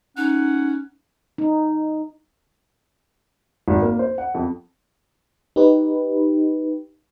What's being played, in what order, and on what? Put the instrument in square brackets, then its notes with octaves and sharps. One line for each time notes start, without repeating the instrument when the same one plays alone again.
[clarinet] C#4 [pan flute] D#4 [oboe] F#5
[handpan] D#4
[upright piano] G#1
A#3
C5
F#5
F2
[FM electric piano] D#4 G4 B4